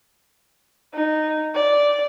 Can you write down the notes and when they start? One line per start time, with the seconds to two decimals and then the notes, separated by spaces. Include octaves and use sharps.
0.94 D#4
1.55 D5